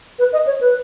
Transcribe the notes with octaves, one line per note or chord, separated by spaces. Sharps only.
B4
D#5
C#5
B4